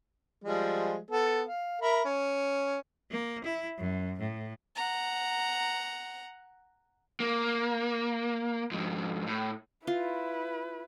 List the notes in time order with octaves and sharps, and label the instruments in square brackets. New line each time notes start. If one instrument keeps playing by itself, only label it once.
[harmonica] F3 G3 G#3
B3 A4
F5
A#4 E5 B5
C#4
[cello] A#3
E4
F#2
A2
[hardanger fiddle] F#5 A#5
[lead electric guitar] A#3
F2 G#2
A2
[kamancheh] E4 B4 [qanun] F4